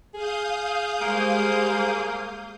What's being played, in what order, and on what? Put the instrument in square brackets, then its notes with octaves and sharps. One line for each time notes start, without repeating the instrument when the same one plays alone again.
[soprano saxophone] G#4 [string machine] F5 D#6 G6
[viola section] G3 G#3 C5 [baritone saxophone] A#3